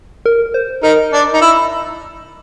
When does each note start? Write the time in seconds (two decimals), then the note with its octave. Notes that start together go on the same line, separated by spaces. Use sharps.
0.26 A#4
0.54 C5
0.83 D#4 A#4
1.13 D4
1.33 D#4
1.41 E4